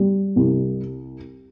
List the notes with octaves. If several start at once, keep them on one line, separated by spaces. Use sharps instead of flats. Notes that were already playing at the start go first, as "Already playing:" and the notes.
Already playing: G3
C2